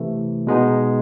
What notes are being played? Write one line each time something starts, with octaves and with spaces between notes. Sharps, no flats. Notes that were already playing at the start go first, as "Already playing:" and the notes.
Already playing: C3 E3 A3
B2 G#3 B3 D#4